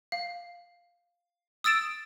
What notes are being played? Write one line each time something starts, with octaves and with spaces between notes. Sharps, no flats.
F5
D#6 E6 A6 D7 E7